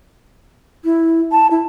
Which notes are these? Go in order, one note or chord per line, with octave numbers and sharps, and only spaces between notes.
E4
A5
E4